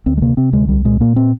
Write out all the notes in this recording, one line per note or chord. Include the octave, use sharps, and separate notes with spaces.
D2 C4
G#3
C3 A#3
C3 C4
D2 G#3
C2 G3
A#2 G#3
A#2 A#3
C4